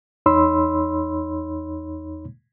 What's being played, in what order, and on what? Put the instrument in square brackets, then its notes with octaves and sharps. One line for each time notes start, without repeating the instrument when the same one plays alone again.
[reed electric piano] E2 D#4 C#5 B5 C6 E6